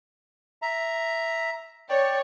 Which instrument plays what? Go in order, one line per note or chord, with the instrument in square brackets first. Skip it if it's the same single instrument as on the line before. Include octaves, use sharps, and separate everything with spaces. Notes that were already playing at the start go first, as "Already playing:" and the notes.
[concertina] E5 A#5
[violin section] C#5 [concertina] D5 G5